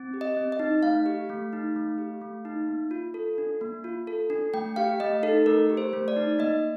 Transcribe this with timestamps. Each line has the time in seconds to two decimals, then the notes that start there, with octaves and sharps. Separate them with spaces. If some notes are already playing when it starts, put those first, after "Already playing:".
Already playing: C4
0.14 G4
0.21 D#5
0.37 C4
0.52 D#5
0.59 D#4
0.83 A3 F5
1.06 G4
1.29 A3
1.53 D#4
1.76 A3
1.98 G4
2.21 A3
2.45 D#4
2.68 A#3
2.91 F4
3.14 A4
3.38 D4
3.61 A#3
3.84 F4
4.07 A4
4.30 D4
4.54 A3 G5
4.76 G4 F5
5.00 A3 D#5
5.23 D#4 A4
5.46 A3 A#4
5.70 G4
5.77 C5
5.93 A3
6.08 D5
6.16 D#4
6.39 A#3 D#5